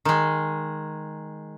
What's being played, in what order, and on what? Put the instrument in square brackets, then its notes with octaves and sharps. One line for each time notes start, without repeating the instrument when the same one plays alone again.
[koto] D#3 G#3